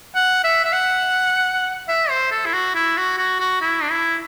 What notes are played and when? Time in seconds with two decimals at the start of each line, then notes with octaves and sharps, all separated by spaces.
0.15 F#5
0.44 E5
0.65 E5
0.73 F#5
1.88 E5
2.10 C5
2.32 A4
2.46 E4
2.53 F#4
2.75 E4
2.97 F#4
3.18 F#4
3.40 F#4
3.61 E4
3.82 D4
3.91 E4